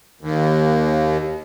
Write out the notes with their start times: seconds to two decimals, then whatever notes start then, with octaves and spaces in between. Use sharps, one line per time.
0.21 D#2